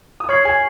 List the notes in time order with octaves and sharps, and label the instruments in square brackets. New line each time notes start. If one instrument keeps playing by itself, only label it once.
[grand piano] D#6
[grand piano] C#5 C#6 [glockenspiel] F6 G#6 C7 F#7
[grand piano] G#4 G#5